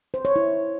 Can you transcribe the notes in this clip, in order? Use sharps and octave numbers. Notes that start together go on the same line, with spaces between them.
C5
C#5
E4